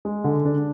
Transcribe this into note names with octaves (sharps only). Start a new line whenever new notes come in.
G#3
D3
D4